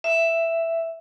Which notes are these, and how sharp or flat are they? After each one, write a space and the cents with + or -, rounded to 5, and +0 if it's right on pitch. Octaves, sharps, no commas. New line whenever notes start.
E5 +5